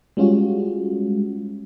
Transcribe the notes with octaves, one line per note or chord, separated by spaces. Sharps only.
G3 G#3 C#4 F4 F#4